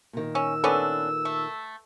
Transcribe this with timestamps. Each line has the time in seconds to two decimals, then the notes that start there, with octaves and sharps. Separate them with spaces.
0.13 A#2 D#3
0.35 C#4 E6
0.64 B3 C#4 D4 A4 B4
1.25 A3